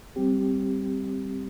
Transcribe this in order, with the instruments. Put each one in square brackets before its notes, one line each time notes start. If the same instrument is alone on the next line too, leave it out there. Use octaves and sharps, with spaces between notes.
[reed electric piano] G3 C4 G4